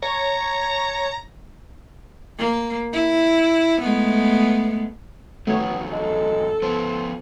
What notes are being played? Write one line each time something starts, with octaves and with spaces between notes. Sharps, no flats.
C#5 A#5
A#3
E4
G#3 A3 B3
F2 D#3 F#3 A3 B3 C#5
G#3 A4
F3 B3 C5